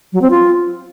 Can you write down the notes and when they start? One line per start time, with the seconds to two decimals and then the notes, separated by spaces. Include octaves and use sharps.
0.13 F#3
0.22 C4
0.30 F4